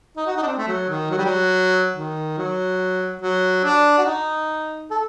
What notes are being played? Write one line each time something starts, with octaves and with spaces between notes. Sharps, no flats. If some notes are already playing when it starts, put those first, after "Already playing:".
D#4
F#4
D#4
D4
C4
A3
F#3
D#3
F#3
G3
F#3
D#3
F#3
F#3
D4
F#4
D#4
A4